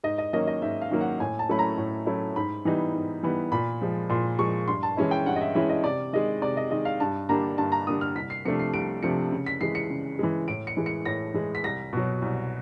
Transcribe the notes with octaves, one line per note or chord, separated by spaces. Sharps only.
G#2 D#5
D#5
D#3 F#3 A#3 C#4 D#5
D#5
G#2 E5
F5
D#3 F#3 A#3 C#4
F#5
A2 G#5
A5
F#3 A3 C#4 E4 B5
A#5
A2
F#3 A3 C#4 E4
G#2 B5
E3 G3 B3 D#4
G#2
E3 G3 B3 D#4
A#2 B5
F3 G#3
A#2 C6
F3 G#3 C#6
G2 C6
A5
E3 G#3 C#4 E4
G5
G2 F#5
D#5
E5
E3 G#3 C#4 E4 E5
D#5
C3 D5
D#3 G#3 D#5
C3 D5
D#5
D#3 G#3 D#5
F5
G2 A5
D3 G3 A#3 D4 A#5
G2 A5
A#5
D3 G3 A#3 D4 D#6
F6
C2 B6
C7
C3 F3 A3 D4 C#7
C7
C2 D7
C3 F3 A3 D4 C#7
C#3
B6
E3 G#3 C7
C#7
C#3
E3 G#3
A2 D7
C#7
E3 G#3
C#7
A2 A#6
E3 G#3
B6
C2 A#6
B2 F#3
C2